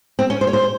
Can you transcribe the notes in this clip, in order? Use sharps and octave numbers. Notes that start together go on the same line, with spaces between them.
C4
C#4
C5
C#5
C5